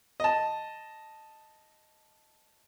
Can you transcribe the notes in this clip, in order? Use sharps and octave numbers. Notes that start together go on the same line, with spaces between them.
D#5 A5